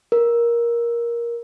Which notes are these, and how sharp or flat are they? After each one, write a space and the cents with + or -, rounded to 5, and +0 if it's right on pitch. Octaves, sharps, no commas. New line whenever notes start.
A#4 +15